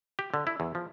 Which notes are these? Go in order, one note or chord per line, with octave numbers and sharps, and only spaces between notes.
G4
D3
E4
E2
F3